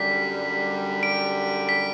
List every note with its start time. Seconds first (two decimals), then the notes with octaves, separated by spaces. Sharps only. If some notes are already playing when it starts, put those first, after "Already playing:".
Already playing: F#2 D3 G3 B6
1.03 D7
1.69 B6